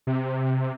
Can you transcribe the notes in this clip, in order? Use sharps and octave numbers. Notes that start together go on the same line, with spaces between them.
C3